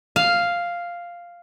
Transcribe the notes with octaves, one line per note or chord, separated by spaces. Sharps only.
F5